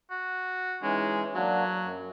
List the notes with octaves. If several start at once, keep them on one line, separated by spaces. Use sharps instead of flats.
F#4
E3 G#3 C#4 D#4
F#3 A#3 D4 F#4
F#2